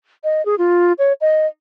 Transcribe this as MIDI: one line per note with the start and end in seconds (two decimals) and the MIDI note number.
0.24 0.44 75
0.46 0.55 68
0.58 0.93 65
0.99 1.13 73
1.21 1.47 75